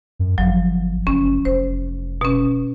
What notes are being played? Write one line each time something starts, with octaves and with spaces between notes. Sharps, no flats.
F#2
G1 F3 F#3
F#1 C#4
F1 C5
B2 C#4